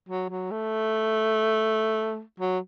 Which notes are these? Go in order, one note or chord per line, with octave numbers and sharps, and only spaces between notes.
F#3
F#3
A3
F#3